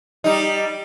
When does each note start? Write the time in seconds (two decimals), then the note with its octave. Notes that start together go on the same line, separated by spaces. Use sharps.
0.24 G3 D#4